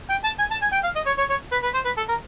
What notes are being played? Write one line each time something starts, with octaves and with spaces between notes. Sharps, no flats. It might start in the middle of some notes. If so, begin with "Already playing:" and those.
G5
A5
G#5
A5
G#5
G5
F5
D#5
C#5
C#5
C#5
B4
B4
C5
B4
A4
A#4